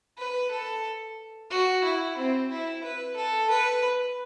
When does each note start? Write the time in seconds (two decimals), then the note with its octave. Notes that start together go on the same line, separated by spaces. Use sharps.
0.18 B4
0.51 A4
1.50 F#4
1.84 E4
2.17 C4
2.51 E4
2.84 B4
3.16 A4
3.50 B4